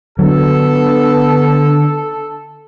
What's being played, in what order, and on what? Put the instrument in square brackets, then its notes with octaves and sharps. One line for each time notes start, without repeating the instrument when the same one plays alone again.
[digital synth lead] D3 [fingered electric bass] F#3 [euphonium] B3 [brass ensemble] A4